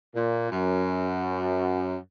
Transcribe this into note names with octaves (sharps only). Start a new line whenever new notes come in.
A#2
F#2